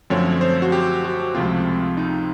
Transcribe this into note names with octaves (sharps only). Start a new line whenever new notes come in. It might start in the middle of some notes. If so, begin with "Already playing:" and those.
F#2 D3 F3 A3 C4 C#5
C5
F#4
G4
F#4
C#2 C3 F3 A3 C4 F4
D#4